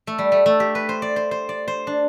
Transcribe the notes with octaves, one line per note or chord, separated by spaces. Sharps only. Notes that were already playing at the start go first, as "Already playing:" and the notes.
A3
G3
A3
A3
G4
B4
C5
D5
C5
C5
D5
C5
D4